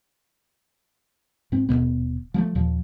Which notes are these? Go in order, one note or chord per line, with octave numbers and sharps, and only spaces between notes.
G#2 C4
D#1 E2 B2 B3
F3 G3 A3
D#2 A#2 F3